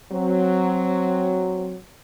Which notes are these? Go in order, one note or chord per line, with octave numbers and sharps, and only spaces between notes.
F#3 C4